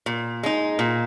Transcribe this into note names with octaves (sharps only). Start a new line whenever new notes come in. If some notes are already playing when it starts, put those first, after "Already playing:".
A#2
G#3 D#4
A#2